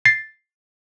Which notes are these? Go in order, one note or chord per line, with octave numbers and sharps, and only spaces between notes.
A6 C7